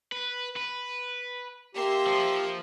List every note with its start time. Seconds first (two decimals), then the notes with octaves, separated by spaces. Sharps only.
0.12 B4
0.57 B4
1.75 A#3 G4 E5 C6
2.07 F3